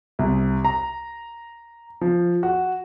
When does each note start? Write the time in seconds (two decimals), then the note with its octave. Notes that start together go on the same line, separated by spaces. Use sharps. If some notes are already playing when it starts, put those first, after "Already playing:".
0.19 C2
0.65 A#5
2.01 F3
2.43 F#4